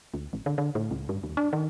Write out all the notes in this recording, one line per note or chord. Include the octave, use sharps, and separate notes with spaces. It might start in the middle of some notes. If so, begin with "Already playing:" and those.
D2
A1
D3
D3
A2
C#2
G2
D#2
D4
D#3